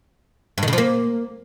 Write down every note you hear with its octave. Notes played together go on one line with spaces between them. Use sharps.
G2
D#3
C#3
F3
A#3